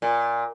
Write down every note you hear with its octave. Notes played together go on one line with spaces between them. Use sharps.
A#2